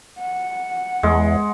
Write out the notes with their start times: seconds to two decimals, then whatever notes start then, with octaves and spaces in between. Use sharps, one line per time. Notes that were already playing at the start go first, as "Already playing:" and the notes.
0.19 F#5
1.03 E2 G#3